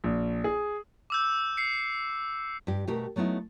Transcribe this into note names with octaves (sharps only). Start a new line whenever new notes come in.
A#1
G#4
D6 E6 G6
C7 C#7
G2 G4
B2 A3 G4 A#4
F#3 A3 B3 D#4 E4